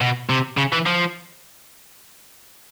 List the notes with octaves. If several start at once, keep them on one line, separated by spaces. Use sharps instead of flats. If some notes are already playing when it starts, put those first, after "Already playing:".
B2
C3
C#3
E3
F3